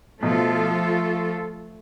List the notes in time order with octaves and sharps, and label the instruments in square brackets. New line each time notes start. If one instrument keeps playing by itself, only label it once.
[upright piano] B2 [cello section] F3 A3 F4 A4